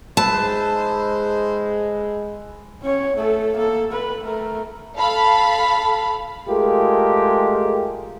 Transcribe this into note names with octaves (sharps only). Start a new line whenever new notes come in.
G#3 D#4 G#4 B4 C5 E5 A5
C#4 C#5
A3 A4
A#3 A4
B4 B5
A3 A#4
A4 F5 B5
G#3 A3 F4 G4 G#4 A#4